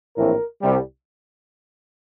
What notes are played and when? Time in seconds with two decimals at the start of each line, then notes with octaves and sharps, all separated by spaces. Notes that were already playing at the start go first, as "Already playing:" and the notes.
0.17 A#1 A2 E3 A3 C4 A#4
0.61 C2 C3 G3